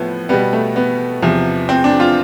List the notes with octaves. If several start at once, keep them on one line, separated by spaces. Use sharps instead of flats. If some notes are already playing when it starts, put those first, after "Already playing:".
Already playing: A2 F3 B3
B2 G3 B3
A3
B3
E2 C3 F3
C4
D4
F4